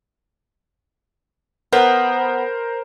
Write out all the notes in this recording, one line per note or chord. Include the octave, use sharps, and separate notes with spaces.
B3 A#4 C5